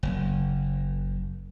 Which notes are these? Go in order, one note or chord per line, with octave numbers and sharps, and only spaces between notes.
F#1